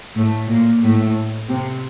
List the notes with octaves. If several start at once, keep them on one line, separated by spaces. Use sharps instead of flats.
A2 A3
A#2 A#3
A2 A3
C3 C4